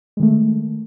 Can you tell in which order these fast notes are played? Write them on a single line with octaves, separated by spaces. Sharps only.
G#3 D#3 A3